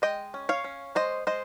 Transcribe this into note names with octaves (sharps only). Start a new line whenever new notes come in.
G#3 D#5 G5
C#4
C#5 F5
C#4
G#3 C5 D#5
G#3 C5 D#5